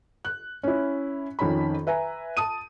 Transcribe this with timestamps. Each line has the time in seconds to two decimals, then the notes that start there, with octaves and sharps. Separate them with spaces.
0.25 F#6
0.63 C#4 E4
1.39 F2 D#3 C#4 B5
1.87 B4 E5 G#5 A#5
2.37 A5 D#6 D#7